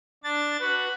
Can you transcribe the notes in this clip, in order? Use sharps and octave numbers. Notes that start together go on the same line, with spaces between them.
D4 A6
F#4 B4